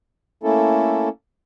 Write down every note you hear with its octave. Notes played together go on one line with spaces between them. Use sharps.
A3 A#3 C#4 E4 A4